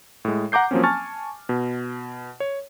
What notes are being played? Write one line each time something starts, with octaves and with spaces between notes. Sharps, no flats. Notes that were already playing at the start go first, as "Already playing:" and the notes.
A2 G#3
F#5 A#5 D6 G6 C7
F3 F#3 A#3 C4 C#4
G#5 A5 C#6 F6 A6
B2
C#5